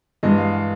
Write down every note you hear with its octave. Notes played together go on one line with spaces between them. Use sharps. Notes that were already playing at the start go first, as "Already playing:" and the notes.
G2 E3 G#3 D#5
F5
F5